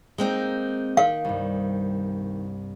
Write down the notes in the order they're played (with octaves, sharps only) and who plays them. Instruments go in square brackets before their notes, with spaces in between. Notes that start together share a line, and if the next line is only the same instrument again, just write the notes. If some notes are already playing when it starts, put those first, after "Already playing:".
[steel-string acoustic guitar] G#3 C4 D#4 [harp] A#3
[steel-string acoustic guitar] D#3 [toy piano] F5
[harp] C2 G2